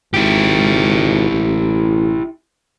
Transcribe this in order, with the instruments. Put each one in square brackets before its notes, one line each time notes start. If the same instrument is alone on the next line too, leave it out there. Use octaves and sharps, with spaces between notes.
[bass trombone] G#1 [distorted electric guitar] E4 G4
[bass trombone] A1